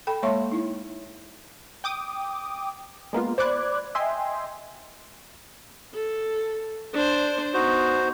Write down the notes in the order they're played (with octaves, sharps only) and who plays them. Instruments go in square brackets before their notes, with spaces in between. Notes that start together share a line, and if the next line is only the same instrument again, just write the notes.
[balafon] A4 G5 B5
G#3 A#3 C#5 E5 C6 C#6
D#4 E4
[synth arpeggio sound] G5 D6 D#6
G#3 A#3 B3 F4
C5 D5 B5 D6 F#6 G#6
D#5 E5 G5 G#5 C6
[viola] A4
D4 C5
[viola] B3 D#4 [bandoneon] F#4 C5